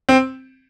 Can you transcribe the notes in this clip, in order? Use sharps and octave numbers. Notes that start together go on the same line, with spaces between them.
C4